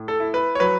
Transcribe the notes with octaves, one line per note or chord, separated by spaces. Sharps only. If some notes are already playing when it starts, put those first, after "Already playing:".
Already playing: A2
A4
E4
B4
C#5
F#3 B4